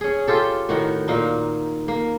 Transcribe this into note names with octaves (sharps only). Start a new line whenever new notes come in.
C#4 G#4
F4 G4 A4
A2 D#3 F#4
A#2 A#3 D#4
A#3